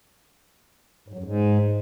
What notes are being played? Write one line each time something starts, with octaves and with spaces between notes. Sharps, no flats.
G#2
F#3
F#2
G#2